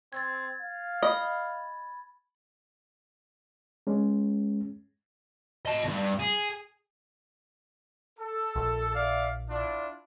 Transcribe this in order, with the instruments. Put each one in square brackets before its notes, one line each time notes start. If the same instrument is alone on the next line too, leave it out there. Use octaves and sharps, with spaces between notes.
[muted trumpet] C4 [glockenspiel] G#6 A6
[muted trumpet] F5
[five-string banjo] D#5 [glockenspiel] B5
[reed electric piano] G#3 C#4
[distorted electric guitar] D#5 A5
E2 G2
G#4
[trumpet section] A4
[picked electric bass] A#1
[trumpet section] D5 E5 F5
D4 E4 F4